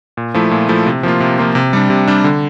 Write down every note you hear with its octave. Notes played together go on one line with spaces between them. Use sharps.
A#2
F3 A3 E4
A#2
F3 A3 E4
C3
F3 A#3 F4
C3
F3 A#3 F4
C3
G3 D4
C3
G3 D4
D3